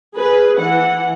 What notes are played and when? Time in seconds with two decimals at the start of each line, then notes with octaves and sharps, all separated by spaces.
0.15 G#4 B4
0.58 E3 F#5